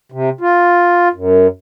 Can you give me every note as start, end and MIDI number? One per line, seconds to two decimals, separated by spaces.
0.12 0.29 48
0.41 1.08 65
1.13 1.47 42